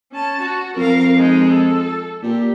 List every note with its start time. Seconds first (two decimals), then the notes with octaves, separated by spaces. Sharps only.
0.12 C#4 A5
0.41 F#4
0.77 F2 A#4 F5
1.18 G#3 D#4
1.52 A4
2.23 A#2 G4